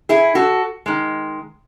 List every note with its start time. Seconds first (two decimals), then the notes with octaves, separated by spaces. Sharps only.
0.09 E4 G#4
0.35 F#4 A4
0.86 D#3 G#3